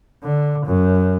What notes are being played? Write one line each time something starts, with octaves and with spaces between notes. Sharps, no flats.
D3
F#2